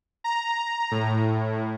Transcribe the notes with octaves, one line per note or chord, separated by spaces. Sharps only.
A#5
A2